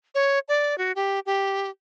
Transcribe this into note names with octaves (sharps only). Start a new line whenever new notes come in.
C#5
D5
F#4
G4
G4